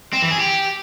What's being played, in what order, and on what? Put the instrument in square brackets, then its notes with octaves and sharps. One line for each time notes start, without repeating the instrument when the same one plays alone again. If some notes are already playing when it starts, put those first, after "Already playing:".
[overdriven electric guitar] C4
E3
G#4
G4